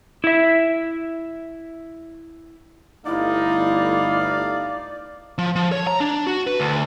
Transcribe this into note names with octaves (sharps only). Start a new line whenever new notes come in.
E4 E5
G1 A3 D#4 E4 D5 F5
F3
F3
C#5
A#5
D4
F#4
B4
D2